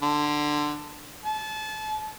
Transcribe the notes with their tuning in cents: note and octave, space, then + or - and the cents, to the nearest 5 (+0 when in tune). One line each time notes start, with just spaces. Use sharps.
D3 +15
A5 -30